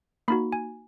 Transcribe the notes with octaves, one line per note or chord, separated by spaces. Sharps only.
A#3 D#4 F#4 B5
G#5